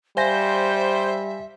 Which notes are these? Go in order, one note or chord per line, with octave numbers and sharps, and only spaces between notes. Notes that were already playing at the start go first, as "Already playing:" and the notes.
G3 C5 E5 F5 G#5 A#6